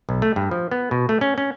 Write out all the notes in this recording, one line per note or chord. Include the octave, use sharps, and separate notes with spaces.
B1
A3
G2
F3
B3
B2
A3
C#4
C#4